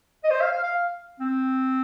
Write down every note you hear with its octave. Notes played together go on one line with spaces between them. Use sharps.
D#5
C5
F5
F5
F5
C4